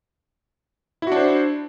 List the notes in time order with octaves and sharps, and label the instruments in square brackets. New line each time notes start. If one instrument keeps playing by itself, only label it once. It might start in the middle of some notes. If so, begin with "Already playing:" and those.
[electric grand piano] E4
F#4
D4
C5